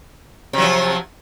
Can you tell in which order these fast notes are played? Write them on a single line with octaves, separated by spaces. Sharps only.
C3 F#3 F3